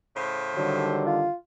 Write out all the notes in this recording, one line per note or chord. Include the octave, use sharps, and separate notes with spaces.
A2 C#3 C5
D3 D#3 F#3 G3
F4